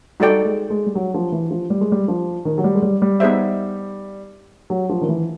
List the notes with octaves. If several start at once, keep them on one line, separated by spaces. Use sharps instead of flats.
G3 D#4 F#4 A4 D5 G5
G#3
G#3
G3
F#3
F3
E3
F3
G3
G#3
G3
F3
D#3
F#3
G3
G#3
G3
G3
B3 D#4 G#4 C5 E5
F#3
F3
D#3
E3